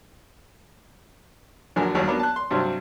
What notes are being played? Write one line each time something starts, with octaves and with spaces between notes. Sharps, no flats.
A#1 D3 F#3 A#4 G#5
D#2 F#3 G3 F#4
F#3 A#3 B3 D4 D6
A5 F#6
C6
G2 C3 F#3 G3 C4